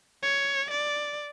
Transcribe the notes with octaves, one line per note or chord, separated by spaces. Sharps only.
C#5
D5